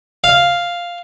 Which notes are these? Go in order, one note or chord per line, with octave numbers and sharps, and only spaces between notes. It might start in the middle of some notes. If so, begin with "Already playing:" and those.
F5